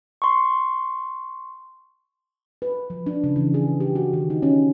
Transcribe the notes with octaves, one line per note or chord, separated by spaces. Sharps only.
C6 C#6
B4
F3
D4
C#3
E3
G#4
G4
F#4
D#3
D#4
C#4